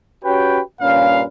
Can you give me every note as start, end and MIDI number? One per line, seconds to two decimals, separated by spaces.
0.24 0.61 61
0.24 0.61 66
0.24 0.61 67
0.24 0.61 71
0.24 0.61 73
0.24 0.61 79
0.81 1.25 43
0.81 1.25 46
0.81 1.25 61
0.81 1.25 71
0.81 1.25 77